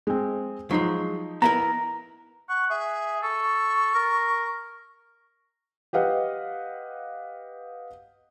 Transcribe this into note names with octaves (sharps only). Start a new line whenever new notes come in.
G#3 C4
F3 F#3 G#3 D#4 C7
B3 E4 A#4 A#5
F#5 C#6
G#4 E5
A4 C#6
A#4
G4 B4 D#5 F5 F#5